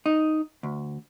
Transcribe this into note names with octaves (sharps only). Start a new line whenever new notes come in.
D#4
D2